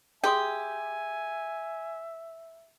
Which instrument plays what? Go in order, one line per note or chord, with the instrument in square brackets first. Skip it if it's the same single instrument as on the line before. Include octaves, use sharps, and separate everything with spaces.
[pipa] G4 [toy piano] G#4 C6 D#6 [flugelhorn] E5 [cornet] G#5